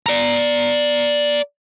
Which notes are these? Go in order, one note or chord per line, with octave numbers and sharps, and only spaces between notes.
D5 A#5